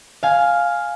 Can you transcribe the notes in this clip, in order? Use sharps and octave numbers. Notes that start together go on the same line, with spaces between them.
F5 G#5